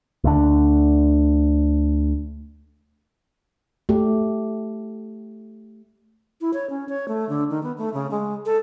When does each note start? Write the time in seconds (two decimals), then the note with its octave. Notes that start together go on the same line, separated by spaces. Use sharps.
0.24 D2 D3
3.89 A3 G4
6.41 E4
6.54 C#5
6.70 C#4
6.89 C#5
7.08 A3
7.29 D3
7.50 D#3
7.63 B3
7.78 A3
7.94 C#3
8.11 G#3
8.46 A4